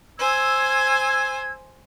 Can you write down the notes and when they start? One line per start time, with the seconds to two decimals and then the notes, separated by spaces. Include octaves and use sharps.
0.19 C5 G#5 E6 G#6